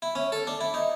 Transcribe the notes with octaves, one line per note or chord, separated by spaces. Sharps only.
E4
C#4
A4
D4
E4
D#4